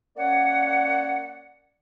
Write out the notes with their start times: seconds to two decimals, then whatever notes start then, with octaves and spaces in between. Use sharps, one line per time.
0.16 A#3 C#4 C#5 D5 F#5